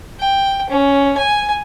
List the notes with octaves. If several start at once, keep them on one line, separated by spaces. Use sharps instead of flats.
G5
C#4
G#5